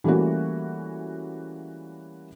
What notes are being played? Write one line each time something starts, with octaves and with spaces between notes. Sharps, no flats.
E3 G3 A3 A#3 C#4 F#4